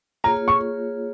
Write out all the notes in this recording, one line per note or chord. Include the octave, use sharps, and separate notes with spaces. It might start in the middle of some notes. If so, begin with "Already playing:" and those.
A#3 F4 G#4 C#5 A#5
C#6